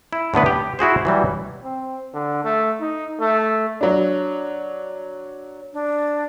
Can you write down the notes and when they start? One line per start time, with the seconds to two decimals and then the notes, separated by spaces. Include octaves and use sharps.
0.13 E4
0.34 A2 D3 B3 B4
0.46 G4
0.79 E4 F#4 G#4 C5
1.05 E3 F#3 G3
1.63 C4
2.14 D3
2.44 A3
2.81 D#4
3.20 A3
3.81 F#3 D4
5.73 D4